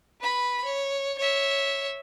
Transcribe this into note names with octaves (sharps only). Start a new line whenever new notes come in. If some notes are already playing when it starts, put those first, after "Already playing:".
B4 B5
C#5
C#5 E5